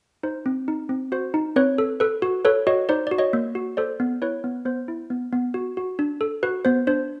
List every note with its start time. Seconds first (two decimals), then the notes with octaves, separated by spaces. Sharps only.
0.23 D#4 C5
0.46 C4
0.68 D#4
0.89 C4
1.12 F#4 C5
1.34 D#4
1.56 C4 B4 C#5
1.78 A4
2.00 A4 B4
2.22 F#4
2.45 A4 B4 C#5
2.67 F#4 C#5 D#5
2.89 D#4 C5 D5
3.07 F#4 D5
3.18 C#5 D#5
3.33 A#3
3.55 F#4
3.77 A4 C5 D5
4.00 B3
4.22 E4 B4 C#5
4.44 B3
4.65 B3 C5
4.88 E4
5.10 B3
5.33 B3
5.54 F#4
5.77 F#4
5.99 D4
6.21 A4
6.43 F#4 B4
6.65 B3 C5
6.87 D4 C5